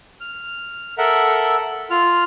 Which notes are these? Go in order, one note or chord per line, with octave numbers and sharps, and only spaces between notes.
F6
A4 A#4 E5 F#5
F4 F6